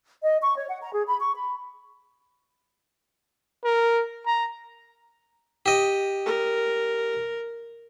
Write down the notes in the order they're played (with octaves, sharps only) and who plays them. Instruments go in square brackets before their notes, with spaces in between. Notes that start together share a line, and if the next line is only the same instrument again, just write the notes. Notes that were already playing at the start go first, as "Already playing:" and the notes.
[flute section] D#5
C#6
C#5
F#5
A#5
G#4
B5
C#6
B5
[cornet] A#4
A#5
[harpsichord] G4 D#5
[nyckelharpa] A#4